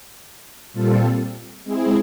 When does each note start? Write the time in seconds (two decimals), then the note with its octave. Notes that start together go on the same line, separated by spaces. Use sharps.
0.73 A#2 G3 C4 F4 A4
1.64 G#3 C4 E4 G#4